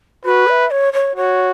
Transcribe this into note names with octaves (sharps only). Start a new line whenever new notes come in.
F#4 B4
E5
C#5
C#5
F#4 C#5